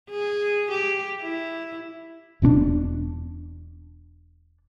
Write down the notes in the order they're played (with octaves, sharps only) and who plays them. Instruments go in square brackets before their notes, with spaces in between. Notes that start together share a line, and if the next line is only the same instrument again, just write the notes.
[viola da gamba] G#4
G4
E4
[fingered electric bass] E1 B2 C4 D4